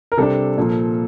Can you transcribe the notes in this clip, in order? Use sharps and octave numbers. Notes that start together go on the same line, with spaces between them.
A#4
C3 G3 D4 A4
A#2 F3 A#3